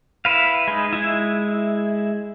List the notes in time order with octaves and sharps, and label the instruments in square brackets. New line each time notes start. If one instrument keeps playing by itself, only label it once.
[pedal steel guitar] E4 B4 F5
G#3 D#4
G#3 E4